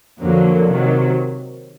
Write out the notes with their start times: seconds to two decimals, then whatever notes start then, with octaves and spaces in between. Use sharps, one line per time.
0.19 F2 D3 F#3 A#3
0.66 C3 D#3 F#3